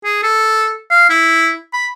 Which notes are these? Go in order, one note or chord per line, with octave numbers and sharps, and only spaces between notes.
G#4
A4
F5
E4
B5